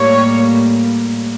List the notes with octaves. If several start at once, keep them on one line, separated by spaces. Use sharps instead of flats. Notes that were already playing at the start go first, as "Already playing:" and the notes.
Already playing: A2 G3 A#3 C#5